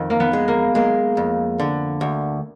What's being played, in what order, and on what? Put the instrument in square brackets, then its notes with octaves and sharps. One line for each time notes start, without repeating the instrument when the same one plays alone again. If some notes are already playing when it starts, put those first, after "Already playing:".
Already playing: [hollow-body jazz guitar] F2 D#3
[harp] A#3
B3
[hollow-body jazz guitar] G#3
[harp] A#3
[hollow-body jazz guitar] G#3 [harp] A#3
[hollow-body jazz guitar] F2
D3
D2